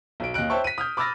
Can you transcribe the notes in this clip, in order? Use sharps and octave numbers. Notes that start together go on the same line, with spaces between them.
B1 D7
D#2 D#5 G5 F#6 D7
C5 C#5 E5 G5 A5 C#6
B6 D#7
D#6 F6 G6
B5 D6 E6 F6 A6 A#6